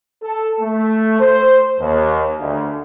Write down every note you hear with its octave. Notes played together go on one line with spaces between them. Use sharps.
A4
A3
C5
D#2
D2